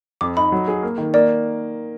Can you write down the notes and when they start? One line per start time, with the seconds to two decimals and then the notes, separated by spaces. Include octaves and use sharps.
0.21 F2 D6
0.37 D#4 B5
0.52 F#3
0.68 G#4
0.83 A#3
0.98 D#3
1.14 A#3 D5